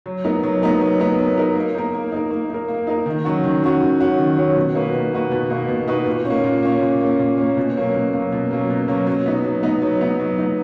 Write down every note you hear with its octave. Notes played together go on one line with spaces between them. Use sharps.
F#3
B3 D#4 A#4
F#3
B3 D#4 A#4
F#3
B3 D#4 A#4
F#3
B3 D#4 A#4
A#3
D#4 A#4
A#3
D#4 A#4
A#3
D#4 A#4
A#3
D#4 A#4
D#3
F#3 C#4 F#4
D#3
F#3 C#4 F#4
D#3
F#3 C#4 F#4
D#3
F#3 C#4 F#4
B2
A#3 D#4 F#4 B4
B2
A#3 D#4 F#4 B4
B2
A#3 D#4 F#4 B4
B2
A#3 D#4 F#4 B4
A#2
A#3 C#4
A#2
A#3 C#4
A#2
A#3 C#4
A#2
A#3 C#4
B2
F#3 A#3 C#4
B2
F#3 A#3 C#4
B2
F#3 A#3 C#4
B2
F#3 A#3 C#4
F#3
B3 D#4
F#3
B3 D#4
F#3
B3 D#4
F#3
B3 D#4